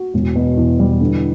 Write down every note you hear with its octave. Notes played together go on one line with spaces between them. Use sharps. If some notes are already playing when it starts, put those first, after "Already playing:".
Already playing: F#4
E1
B2
E2
G3
D3